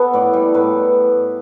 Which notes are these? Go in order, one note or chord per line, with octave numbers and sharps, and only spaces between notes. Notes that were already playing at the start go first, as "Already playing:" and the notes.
Already playing: B3 A4 B4
A2 D5
G3
A2 B4